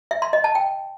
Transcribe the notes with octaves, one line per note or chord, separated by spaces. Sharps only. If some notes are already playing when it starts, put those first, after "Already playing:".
E5
C6
D#5
A5
G5